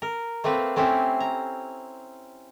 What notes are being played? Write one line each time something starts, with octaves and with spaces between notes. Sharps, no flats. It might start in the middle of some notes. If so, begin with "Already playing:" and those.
A#4
A3 A#3 C4 B4
A3 C4 C#4 E4 G4
A#5